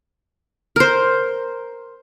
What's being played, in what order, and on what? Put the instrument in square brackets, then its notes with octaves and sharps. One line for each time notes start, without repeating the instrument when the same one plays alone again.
[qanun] A#4 C5